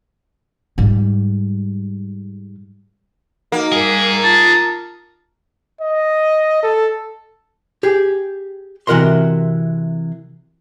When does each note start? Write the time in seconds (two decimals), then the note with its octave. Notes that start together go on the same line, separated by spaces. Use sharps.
0.78 G#2 G3
3.52 A#3 D#4 F#4 D#5
3.72 G3 D#4 G#4 A#4
4.24 F4 A5
5.81 D#5
6.63 A4
7.83 G4 G#4
8.87 C3 E3 F#4 A#4 D#5 C6